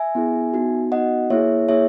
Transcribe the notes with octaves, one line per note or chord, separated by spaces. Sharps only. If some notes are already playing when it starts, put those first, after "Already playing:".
Already playing: E5 G#5
B3 E4 G#4
B3 D#4 F#4
B3 D#4 F#4 D#5 F#5
A#3 E4 G#4 C#5 E5
A#3 E4 G#4 C#5 E5